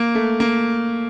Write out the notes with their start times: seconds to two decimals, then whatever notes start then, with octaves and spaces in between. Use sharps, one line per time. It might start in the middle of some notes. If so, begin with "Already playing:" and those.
Already playing: A#3
0.15 A3
0.40 A#3